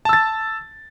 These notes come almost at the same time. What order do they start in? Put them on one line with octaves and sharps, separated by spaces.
A5 E6 A6